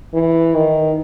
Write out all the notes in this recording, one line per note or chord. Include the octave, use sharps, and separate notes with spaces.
E3
D#3